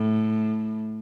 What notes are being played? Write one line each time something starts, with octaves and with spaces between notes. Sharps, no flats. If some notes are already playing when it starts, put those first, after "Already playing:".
Already playing: A2